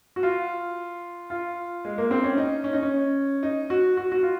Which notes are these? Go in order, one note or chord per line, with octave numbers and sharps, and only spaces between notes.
F#4
F4
F4
G#3
A#3
C4
C#4
D#4
C#4
D#4
C#4
D#4
F#4
F#4
F#4
F4